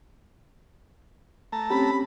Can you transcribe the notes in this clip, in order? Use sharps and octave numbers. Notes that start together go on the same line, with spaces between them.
A3 A5 A#5
C4 C#4 G4 B5